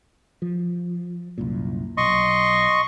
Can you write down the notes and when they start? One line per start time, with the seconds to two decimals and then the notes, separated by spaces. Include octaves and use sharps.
0.42 F3
1.38 C2 F#2 A#2
1.97 B1 D#5 C6 C#6